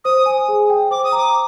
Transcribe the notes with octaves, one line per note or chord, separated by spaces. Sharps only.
C5 D#6
G#5
G#4
G5
C5 D6
D#6
A#5
D6